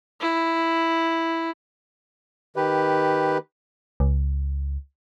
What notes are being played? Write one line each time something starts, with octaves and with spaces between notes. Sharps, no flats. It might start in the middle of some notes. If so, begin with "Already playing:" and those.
E4
D#3 G4 B4
C#2